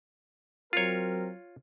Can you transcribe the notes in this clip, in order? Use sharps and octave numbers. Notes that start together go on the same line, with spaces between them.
F#3 C4 F4 A#4 C#5